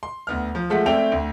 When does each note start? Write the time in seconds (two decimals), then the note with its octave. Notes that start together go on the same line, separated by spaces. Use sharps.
0.03 C6
0.27 D2 B3 F6
0.55 F3
0.70 F3 G#3 A3 F#5 B6
0.86 A3 C4 E4 D5 G5 F7
1.12 D2